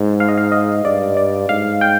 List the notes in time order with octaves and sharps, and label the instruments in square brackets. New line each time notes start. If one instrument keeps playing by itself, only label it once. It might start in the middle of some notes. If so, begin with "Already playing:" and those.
Already playing: [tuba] G#2
[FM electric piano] F5
D#5
F5
D#5
[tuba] G2 [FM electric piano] D5
[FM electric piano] D5
[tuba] G#2 [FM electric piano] F5
[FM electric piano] G5